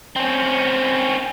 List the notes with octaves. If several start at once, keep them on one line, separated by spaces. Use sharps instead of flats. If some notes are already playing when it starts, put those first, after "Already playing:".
C4 C#4